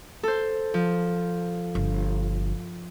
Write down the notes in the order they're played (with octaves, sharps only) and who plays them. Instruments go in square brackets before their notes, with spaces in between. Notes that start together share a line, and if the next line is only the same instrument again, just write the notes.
[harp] A4 C5
F3
[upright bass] G1